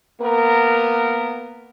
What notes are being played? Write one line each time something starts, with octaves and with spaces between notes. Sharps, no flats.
A#3 B3 A#4